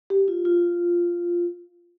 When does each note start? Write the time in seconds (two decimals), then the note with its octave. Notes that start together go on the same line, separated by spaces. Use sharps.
0.10 G4
0.28 F4
0.45 F4